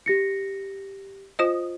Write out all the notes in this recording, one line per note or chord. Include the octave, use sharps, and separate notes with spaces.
G4 A#6 C#7
F4 C5 D#5 D#6